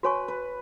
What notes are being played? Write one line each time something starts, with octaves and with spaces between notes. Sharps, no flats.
F#4 B4 C#5 G#5 C#6
B4